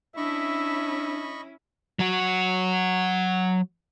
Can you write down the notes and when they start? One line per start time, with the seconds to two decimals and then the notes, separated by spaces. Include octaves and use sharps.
0.17 C#4 D4 E4 D#5 E5 B5 C#6
1.99 F#3 F#4